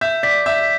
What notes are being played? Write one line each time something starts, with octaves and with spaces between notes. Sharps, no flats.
E5 G6
D5 B6
E5 G6